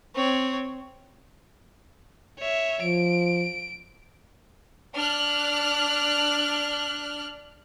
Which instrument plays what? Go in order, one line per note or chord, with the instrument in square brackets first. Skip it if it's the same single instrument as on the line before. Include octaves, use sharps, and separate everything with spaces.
[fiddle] C4 C#5
[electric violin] C#5 E5
[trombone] F3 [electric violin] D7
[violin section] D4 F6 F#6